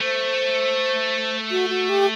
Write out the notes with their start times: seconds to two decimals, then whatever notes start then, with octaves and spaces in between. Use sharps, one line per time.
0.01 A3 C5
1.51 F#4
1.70 F#4
1.89 G4